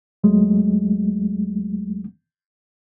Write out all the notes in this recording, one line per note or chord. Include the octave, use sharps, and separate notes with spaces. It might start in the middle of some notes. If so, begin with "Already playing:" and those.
D#2 F#3 G#3 A3